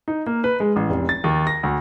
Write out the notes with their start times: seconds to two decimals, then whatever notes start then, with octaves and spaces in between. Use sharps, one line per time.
0.08 D#4
0.26 A#3
0.44 B4
0.60 G#3
0.76 A1
0.89 F1
1.09 A6
1.24 D#2
1.47 A#6
1.63 D2